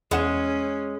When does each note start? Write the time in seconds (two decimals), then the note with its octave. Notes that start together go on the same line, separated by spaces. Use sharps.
0.11 E2 G#3 C#4 F#5 E7